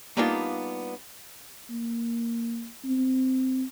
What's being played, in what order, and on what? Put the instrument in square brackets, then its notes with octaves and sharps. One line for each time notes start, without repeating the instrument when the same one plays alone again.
[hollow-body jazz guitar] G3 A#3 B3 D4 D#4 F4
[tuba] A#3
C4